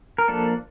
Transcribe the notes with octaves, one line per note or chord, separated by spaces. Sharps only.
A#4
F3 A#3 D4 A4